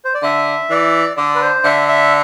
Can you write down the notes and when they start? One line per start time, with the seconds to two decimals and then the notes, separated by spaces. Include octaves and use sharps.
0.05 C5
0.14 D5
0.23 D3 E5
0.70 E3 D5
1.17 D3 D5
1.35 B4
1.42 C5
1.65 D3 E5
1.88 E5